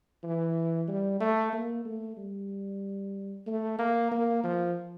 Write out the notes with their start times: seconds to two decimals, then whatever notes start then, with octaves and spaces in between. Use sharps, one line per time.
0.24 E3
0.88 G3
1.20 A3
1.53 A#3
1.85 A3
2.17 G3
3.47 A3
3.79 A#3
4.11 A#3
4.44 F3